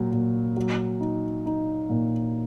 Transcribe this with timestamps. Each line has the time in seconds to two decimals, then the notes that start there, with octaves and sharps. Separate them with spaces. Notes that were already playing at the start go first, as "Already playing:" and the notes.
Already playing: A#2 F#3
0.12 A#2
0.57 F#3
1.00 D#4
1.46 D#4
1.89 A#2